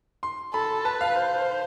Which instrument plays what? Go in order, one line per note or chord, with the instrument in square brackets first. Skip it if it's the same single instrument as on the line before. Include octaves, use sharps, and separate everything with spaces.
[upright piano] C6
[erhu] A4 [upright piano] B5
[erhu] B4 [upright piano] A5
[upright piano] F5
[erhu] C5